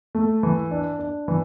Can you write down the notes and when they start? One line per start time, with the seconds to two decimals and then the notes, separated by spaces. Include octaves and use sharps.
0.15 A3
0.43 E3
0.71 D4
0.99 D4
1.28 E3